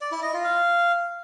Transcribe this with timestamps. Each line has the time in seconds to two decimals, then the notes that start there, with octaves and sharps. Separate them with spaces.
0.01 D5
0.12 E4
0.23 D#5
0.33 F4
0.44 F5